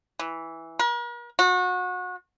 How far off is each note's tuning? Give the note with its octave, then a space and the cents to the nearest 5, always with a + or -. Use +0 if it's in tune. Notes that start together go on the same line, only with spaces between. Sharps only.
E3 -5
A#4 +45
F#4 -30